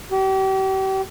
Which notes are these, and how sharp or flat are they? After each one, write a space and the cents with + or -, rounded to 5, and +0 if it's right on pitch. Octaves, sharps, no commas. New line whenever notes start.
G4 -35